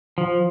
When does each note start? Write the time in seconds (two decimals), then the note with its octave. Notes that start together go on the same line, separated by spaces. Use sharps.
0.18 F3